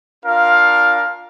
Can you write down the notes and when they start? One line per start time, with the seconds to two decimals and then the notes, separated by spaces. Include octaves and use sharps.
0.23 D4 F4 A#4 F5